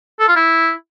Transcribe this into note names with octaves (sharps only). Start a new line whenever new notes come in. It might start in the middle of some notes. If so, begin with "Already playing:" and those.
A4
F4
E4